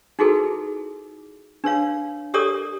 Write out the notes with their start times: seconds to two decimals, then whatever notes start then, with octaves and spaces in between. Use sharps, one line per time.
0.19 D#4 E4 F#4 G#4 A4 B4
1.64 D4 B4 C#5 F5
2.34 G4 A4 A#4 C#5 D5 D#6